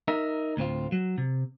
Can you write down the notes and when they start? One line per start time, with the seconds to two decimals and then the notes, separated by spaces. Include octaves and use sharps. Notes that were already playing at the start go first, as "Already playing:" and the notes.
0.08 D#4 A#4 E5
0.57 D2 A2 C4 F4
0.92 F#3
1.18 C3